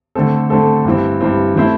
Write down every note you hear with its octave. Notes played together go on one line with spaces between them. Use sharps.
D3 A3 C4 A4
D3 A3 C4 A4
G2 E3 C4
G2 E3 C4
E3 A3 C4 E4 C5